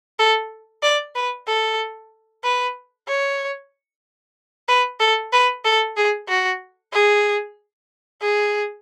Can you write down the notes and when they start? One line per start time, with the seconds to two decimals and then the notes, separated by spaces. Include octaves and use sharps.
0.19 A4
0.83 D5
1.15 B4
1.47 A4
2.44 B4
3.08 C#5
4.69 B4
5.00 A4
5.33 B4
5.65 A4
5.97 G#4
6.28 F#4
6.93 G#4
8.21 G#4